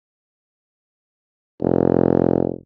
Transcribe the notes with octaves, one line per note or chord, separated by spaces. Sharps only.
F1